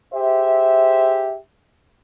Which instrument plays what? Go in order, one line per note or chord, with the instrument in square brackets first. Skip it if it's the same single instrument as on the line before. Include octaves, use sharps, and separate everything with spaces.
[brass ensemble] G4 G#4 C5 E5